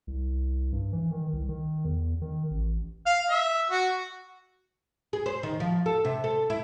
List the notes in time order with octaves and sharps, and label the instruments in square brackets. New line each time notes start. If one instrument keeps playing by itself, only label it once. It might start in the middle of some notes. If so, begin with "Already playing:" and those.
[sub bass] C2
G2
E3
D#3
C2
D#3
E2
D#3
A1
[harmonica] F5
E5
F#4
[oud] G#4
C5
D#3
F3
A4
C3
A4
E4